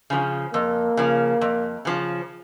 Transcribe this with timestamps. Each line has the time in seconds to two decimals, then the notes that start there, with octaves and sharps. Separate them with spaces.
0.10 C#3 F3
0.53 F2 A#3
0.97 C#3 F3
1.41 F2
1.85 C#3 F3